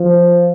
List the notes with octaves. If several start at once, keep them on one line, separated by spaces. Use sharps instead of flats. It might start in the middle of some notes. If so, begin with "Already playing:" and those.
Already playing: F3